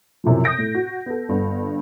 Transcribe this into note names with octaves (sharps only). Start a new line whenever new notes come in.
F#2 C3 E3 F3
D#6 G6 A#6 D7
A2
F#4
B3 A4
G1 G2 D3 B3